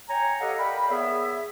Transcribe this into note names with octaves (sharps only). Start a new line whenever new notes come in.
C#5 G5 G#5 A#5
G4 A4 C#5 D#5 F5 F#5
A#4 D5 F5 G5 B5
B3 G#4 C#5 E5